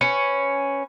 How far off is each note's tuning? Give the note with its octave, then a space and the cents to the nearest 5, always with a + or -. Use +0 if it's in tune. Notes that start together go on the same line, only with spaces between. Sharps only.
C#4 +0 B4 +20